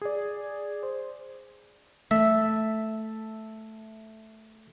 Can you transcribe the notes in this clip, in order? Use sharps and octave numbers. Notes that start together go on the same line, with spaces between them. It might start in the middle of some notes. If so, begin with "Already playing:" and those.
G#4 D5
C5
A3 E5